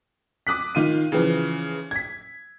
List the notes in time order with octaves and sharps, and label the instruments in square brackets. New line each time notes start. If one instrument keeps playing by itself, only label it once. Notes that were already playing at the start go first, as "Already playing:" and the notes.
[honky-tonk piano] D6 D#6 F#6 B6
D#3 F4 D#7
C#3 E3 F3
G#6 B6